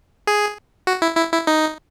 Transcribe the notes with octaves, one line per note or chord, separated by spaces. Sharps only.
G#4
F#4
E4
E4
E4
D#4